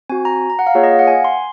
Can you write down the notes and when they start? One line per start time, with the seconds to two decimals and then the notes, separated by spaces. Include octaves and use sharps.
0.09 C4 F#4 G#5
0.25 A#5
0.50 A#5
0.59 F#5
0.67 F5
0.75 A#3 F4 G#4 C#5
0.84 D#5
0.92 F5
0.99 F#5
1.07 G#5
1.25 C6